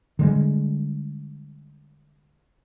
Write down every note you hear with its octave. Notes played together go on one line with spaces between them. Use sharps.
D3 G3 G#3